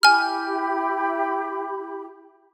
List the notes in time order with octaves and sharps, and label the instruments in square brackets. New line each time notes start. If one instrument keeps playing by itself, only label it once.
[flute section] E4 G4 B5 [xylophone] G#5 F6